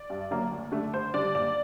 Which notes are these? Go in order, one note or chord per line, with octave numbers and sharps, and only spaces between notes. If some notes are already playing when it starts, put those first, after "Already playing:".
Already playing: D5
G2
D3 F#3 A#3
D2
D3 A3 D4
D2 C5
D3 G3 D5
A#2 D5